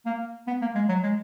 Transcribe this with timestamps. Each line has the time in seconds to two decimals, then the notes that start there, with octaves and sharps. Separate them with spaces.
0.06 A#3
0.47 B3
0.62 A#3
0.75 G#3
0.89 F#3
1.03 G#3